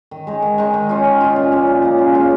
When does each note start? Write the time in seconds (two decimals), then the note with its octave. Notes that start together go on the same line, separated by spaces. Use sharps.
0.11 D#3
0.27 G#3 D#4
0.42 D#3
0.58 G#3 D#4
0.74 D#3
0.89 C#4 F4
1.05 D#3
1.21 C#4 F4
1.36 A#2
1.52 F3 A#3 C#4
1.67 A#2
1.83 F3 A#3 C#4
1.99 C#3
2.14 G#3 C#4 F4